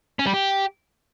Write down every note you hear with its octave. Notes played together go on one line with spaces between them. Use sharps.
C#4
G3
G4